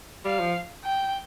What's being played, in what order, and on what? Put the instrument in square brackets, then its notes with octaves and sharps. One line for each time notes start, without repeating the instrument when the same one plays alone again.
[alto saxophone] G3 [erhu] F5
[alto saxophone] F3
[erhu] G5